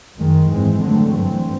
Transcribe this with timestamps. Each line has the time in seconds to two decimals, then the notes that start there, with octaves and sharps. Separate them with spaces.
0.15 F#2 D#3 G#3
0.48 G#2 E3 G#3 C4
0.81 D3 F#3 A3 C4
1.15 G2 E3 G3 C4